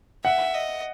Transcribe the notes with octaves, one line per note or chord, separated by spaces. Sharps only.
E5 F#5
D#5